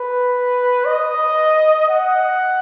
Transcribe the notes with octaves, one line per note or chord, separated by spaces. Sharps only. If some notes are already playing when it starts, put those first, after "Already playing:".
Already playing: B4
D#5
F#5